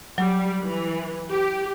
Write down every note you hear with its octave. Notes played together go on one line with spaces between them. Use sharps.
F#3 G3
E3
G4